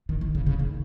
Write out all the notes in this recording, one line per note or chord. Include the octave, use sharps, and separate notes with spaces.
D#3
D#3
C#3
C#3
D#3